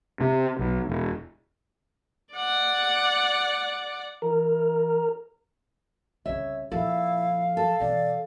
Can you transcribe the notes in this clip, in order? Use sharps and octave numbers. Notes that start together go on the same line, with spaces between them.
C3
B1
E1
D5 F#5
E3 A#4
C2 C#3 C#5 E5
A#2 F3 E4 A4 F5
A4 A5
B2 E3 D5